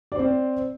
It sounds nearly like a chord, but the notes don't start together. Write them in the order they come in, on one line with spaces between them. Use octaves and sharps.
D5 C5 C4